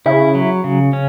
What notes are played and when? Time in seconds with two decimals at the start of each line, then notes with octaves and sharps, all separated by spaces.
0.06 C#3 E4
0.35 F#3
0.64 C#3
0.93 C#4